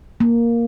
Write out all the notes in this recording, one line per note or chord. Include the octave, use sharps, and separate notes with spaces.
A#3